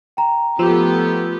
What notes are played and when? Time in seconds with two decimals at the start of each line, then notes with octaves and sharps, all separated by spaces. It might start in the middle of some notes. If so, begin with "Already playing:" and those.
0.17 G5 A#5
0.59 F3 A3 B3 G4 C6 E6